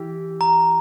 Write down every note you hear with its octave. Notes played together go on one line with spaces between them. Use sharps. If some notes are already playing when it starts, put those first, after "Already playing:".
Already playing: E3 G4
A#5